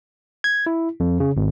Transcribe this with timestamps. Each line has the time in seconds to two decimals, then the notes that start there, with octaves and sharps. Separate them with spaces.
0.44 G#6
0.66 E4
1.00 F2
1.20 C#3
1.37 G#1